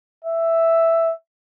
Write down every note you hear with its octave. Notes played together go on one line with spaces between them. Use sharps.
E5